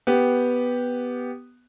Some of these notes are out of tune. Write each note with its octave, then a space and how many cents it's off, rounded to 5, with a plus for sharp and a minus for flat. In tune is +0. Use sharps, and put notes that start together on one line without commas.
B3 +0 G4 +0